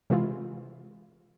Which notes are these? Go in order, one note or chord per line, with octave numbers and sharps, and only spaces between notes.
C3 E3 G#3 E4 F4